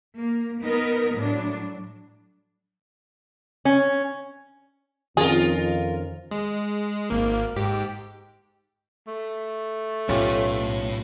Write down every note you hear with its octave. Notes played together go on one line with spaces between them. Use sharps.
A#3
B3 D#4 A#4
A2 F#3 D4
C#4
F2 D#3 C#4 F4 G#4 A#4
G#3
G#1 A#3
G#2 G4
A3
B1 A2 C#4 F4 G4